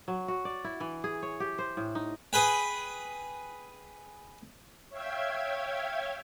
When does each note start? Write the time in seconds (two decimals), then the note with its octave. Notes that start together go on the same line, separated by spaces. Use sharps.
0.08 F#3
0.28 F#4
0.45 D5
0.64 E4
0.80 E3
1.04 G#4
1.23 C#5
1.40 G4
1.58 C5
1.77 A2
1.95 D#4
2.33 G#4 B4 G5
4.89 C#5 E5 F5 G5 G#6